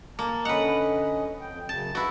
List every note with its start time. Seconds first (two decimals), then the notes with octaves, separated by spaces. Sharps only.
0.19 A#3 A5
0.45 D3 C#4 B4 D#5 F#5
1.41 F2 G5
1.69 F#2 C#3 A5
1.95 E4 F#4 B4